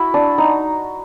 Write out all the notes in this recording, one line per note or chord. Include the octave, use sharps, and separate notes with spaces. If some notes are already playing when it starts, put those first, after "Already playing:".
Already playing: E4 F#4
D4
D#4